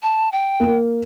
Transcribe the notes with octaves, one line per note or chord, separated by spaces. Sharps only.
A5
G5
A#3 A#4